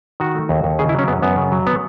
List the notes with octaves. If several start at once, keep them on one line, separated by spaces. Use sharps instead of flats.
D#3 F#4
A3
D#2
D#2
C#3 G#4
E4
F#3 C#4
F#2 B3
F#2 B3
C#3
F#3
B3